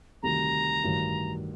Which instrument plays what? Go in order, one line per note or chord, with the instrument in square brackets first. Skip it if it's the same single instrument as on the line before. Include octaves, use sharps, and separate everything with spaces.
[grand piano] D2 C3 D#3 G3 [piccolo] A#5
[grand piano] A1 G2 D#3 F#3